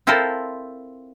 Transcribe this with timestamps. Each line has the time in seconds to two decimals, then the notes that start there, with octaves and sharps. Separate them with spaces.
0.07 C4 E4 F4 A4 A#4 C5